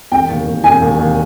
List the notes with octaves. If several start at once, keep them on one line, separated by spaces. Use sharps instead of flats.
E1 G5
D#2
D#2
E1 G#5
D#2
D#2